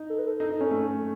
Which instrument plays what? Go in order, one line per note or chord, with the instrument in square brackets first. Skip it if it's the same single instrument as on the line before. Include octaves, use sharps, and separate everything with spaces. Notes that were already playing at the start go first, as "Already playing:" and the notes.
Already playing: [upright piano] D#4
[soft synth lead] A4
B4
A4
[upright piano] D#4 [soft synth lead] A4
[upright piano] D#4
[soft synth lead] A4
[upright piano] C#4
A3